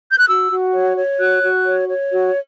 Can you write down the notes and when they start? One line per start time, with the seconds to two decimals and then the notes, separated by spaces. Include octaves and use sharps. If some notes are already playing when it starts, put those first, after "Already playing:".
0.10 G6
0.19 F#6
0.28 F#4 E6
0.51 F#4
0.74 C#5
0.97 C#5
1.20 F#4 F#6
1.43 F#4
1.65 C#5
1.89 C#5
2.11 F#4